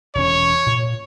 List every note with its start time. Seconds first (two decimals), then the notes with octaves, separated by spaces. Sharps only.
0.15 E1 C#4 C#5
0.66 A#2